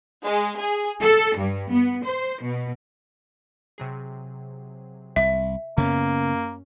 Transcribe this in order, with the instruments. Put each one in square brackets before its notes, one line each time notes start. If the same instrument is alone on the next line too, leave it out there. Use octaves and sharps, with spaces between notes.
[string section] G#3
G#4
A4
G2
B3
C5
B2
[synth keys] C3 F#3 G#4
[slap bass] C2 [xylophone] E5
[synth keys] F#2 C#4 [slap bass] C#3 B3 [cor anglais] A#3